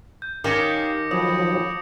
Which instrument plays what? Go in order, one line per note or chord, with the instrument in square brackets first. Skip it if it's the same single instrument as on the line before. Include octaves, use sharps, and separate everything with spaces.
[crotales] G6
[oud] D#3 [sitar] A#3 C#4 G4 [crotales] D6 A#6 C#7
[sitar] F2 [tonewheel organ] F3 F#3 [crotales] D#6